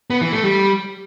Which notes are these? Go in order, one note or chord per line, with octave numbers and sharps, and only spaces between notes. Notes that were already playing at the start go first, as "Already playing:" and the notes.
B3
E3
A3
G3